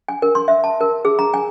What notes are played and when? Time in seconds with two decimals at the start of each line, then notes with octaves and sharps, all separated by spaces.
0.08 G#5
0.22 A#4
0.35 C6
0.48 E5
0.64 A5
0.81 A#4
1.05 G#4
1.19 A#5
1.34 G#5